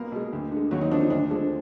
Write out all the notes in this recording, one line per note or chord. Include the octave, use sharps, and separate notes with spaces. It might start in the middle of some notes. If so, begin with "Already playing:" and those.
Already playing: B1 A#3 A#4
B2 G#3
D2
D3 G#3
D#2 F#3 F#4
D#4
D3 F3 D4
D#4
D2 D4
D3 F3 G#3